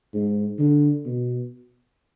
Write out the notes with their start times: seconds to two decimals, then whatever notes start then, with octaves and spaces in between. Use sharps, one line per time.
0.13 G#2
0.58 D3
1.05 B2